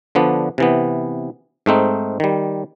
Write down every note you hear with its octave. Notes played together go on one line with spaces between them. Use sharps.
D3 F3 B3 D4
C3 E3 B3
G#2 A3 C4 D#4
D#3 G3